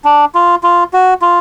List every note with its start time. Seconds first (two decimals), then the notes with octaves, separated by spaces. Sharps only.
0.05 D4
0.35 F4
0.63 F4
0.93 F#4
1.22 F4